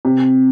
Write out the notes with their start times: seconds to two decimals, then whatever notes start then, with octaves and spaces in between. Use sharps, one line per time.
0.05 C3